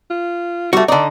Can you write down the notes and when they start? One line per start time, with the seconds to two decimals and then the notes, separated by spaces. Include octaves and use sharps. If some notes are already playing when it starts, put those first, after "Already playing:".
0.10 F4
0.73 G3 A3 F#4
0.88 D3 D#4 D5